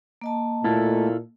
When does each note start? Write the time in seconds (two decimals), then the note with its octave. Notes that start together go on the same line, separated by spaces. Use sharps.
0.21 A#3 D#5 A5
0.64 A#2 A3 E4 F4 A4